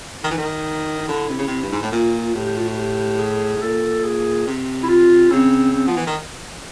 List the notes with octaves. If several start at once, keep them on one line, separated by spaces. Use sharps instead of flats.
D#3 D#4
E3
D#3
D#4
D3 E4
C3
C#3
C3
G2
G#2
A2
A#2 F4
A2 G4
G4
F4
F#4
G4
G#4
A2
A#2 A4
G#4
C3
E4
F4
C#3 C4
C4
F3 B3
E3
D#3